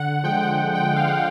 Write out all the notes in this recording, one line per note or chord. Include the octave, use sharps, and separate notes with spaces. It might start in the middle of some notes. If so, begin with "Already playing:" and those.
Already playing: D3 F#5
F3 G#3 G5
F#5
D3 G5
G5
F3 G#3
F5
F#5